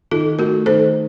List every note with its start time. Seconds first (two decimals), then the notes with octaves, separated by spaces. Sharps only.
0.11 D#3 F4 A4
0.39 A3 F#4 A#4
0.66 D#3 A4 C5